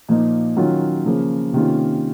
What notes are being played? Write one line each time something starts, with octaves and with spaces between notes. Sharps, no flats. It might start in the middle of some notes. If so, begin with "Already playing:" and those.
A#2 F3 A#3 D#4
D#3 F#3 C#4 F4
C#3 F3 A#3 C#4
C3 D#3 A#3 C#4 F4